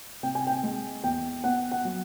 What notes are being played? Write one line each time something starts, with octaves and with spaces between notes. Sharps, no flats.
C3 G5
G#5
G5
G#3
E2 G5
B3 F#5
F#5
F#3